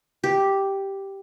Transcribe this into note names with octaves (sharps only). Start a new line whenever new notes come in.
G4